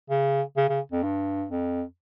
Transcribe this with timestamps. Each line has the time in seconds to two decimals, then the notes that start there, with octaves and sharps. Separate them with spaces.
0.10 C#3
0.57 C#3
0.69 C#3
0.92 F2
1.03 G2
1.51 F2